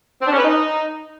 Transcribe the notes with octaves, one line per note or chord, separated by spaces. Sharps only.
C4
D4
C#4
B4
D#4